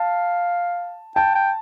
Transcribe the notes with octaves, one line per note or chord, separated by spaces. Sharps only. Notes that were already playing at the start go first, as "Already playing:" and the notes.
Already playing: F5 A5
G5 A5
G5